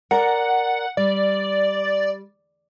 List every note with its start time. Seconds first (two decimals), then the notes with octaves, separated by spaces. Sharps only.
0.11 A#4 D5 F#5 A#5
0.97 G3 D5